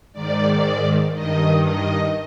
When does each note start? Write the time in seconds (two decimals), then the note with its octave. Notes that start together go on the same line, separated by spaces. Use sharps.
0.13 G#2 D#3 D5
1.14 G2 D#3 D#5
1.64 D#5